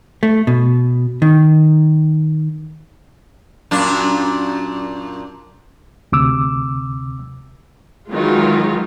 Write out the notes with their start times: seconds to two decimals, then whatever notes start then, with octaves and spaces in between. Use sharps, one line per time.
0.23 A3
0.47 B2
1.22 D#3
3.71 F#2 A#2 D4
6.12 D2 C3 D6 E6
8.10 D#3 E3 F#3 G#3 D#4 F4